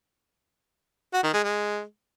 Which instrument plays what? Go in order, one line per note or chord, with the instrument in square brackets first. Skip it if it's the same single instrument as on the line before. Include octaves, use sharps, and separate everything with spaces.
[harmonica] F#4
D#3
G#3
G#3